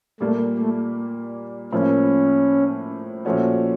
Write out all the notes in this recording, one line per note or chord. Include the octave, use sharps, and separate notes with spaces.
A#2 G3 A3 A#3
A3
A2 F3 A#3 C#4
A#2 F3 A3 C#4 F#4